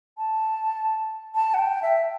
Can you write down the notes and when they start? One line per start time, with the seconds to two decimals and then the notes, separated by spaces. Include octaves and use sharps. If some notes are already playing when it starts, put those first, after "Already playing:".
0.18 A5
1.35 A5
1.54 F#5
1.59 G5
1.82 E5